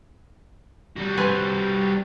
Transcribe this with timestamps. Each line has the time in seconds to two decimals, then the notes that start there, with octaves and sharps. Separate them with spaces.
0.97 G3 F#4
1.17 C4 B4 G#5